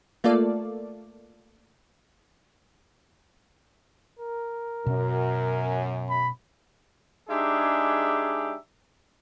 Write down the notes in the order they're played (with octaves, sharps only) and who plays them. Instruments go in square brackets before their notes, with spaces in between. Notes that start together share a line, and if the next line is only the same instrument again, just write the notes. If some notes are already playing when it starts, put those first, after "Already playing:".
[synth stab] A3 A#3 F4 A4 D5
[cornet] A#4
[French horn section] F#2 [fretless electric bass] B2 C#4
[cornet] B5
[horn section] G#3 D4 D#4 G4 G#4 E5